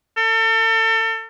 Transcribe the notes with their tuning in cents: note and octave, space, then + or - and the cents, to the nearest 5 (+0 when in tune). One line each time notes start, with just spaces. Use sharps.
A4 +35